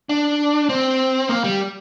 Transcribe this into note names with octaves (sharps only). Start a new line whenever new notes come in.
D4
C4
A#3
G3